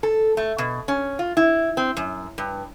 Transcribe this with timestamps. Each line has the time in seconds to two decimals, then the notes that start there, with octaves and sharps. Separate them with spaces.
0.03 A4
0.37 A3
0.58 B2
0.88 C#4
1.19 F4
1.37 E4
1.77 C4
1.97 F#2
2.38 G2